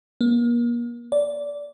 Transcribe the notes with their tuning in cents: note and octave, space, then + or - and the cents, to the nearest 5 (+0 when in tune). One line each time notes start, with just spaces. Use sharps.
A#3 +35
D5 -15